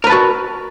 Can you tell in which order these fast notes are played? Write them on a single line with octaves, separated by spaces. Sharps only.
A#4 B4 A5 F#4